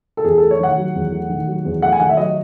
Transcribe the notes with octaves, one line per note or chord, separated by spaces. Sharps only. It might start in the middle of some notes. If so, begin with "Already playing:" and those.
A4
E2 G#4
A3 A4
C#5
D#3 F#5
F#3
E2
A3
D#3
F#3
E2
A3 F#5
G#5
D#3 F#5
E5
F#3 D#5